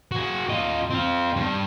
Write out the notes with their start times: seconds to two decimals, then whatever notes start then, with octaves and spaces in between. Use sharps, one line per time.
0.12 F#4 G#4
0.50 F4 D#5
0.90 C4 F4
1.36 G2